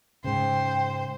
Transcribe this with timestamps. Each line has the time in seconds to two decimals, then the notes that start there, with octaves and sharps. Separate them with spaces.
0.24 G#2 C#3 C5 G5